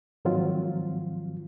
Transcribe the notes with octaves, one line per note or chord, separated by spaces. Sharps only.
G#2 D#3 F3 F#3 C4 F4